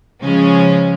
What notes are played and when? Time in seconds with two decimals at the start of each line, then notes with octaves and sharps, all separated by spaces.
0.22 C#3 F3 G#3 C#4